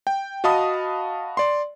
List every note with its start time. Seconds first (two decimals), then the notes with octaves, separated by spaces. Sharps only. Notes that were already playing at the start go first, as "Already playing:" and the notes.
0.07 G5
0.44 F#4 D#5 F5 A5 B5 D#6
1.37 D5 C6